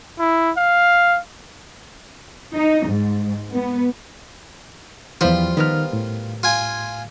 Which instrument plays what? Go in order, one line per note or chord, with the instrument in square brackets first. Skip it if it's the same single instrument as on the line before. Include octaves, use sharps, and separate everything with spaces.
[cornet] E4
F5
[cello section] D#4
G#2
B3
[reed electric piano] E2 E3 [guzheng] F3 G3 B5 [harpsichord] F4
[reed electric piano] D#3 F6 [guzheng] B3 A#4 B4
[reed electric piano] A2
[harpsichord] F4 G#5